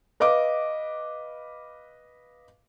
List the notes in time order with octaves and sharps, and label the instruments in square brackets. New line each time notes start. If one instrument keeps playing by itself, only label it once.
[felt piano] B4 D#5 F5 D6